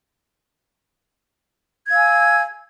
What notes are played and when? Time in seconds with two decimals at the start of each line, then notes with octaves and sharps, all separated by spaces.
1.86 G#6
1.89 F5
1.93 E6
1.96 G#5